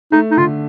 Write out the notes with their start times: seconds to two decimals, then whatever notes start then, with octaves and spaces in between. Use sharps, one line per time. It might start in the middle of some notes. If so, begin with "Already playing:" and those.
0.12 A3 D#4
0.31 D#4
0.37 D3 F4